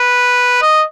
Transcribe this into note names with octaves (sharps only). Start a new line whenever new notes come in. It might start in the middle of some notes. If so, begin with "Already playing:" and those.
Already playing: B4
D#5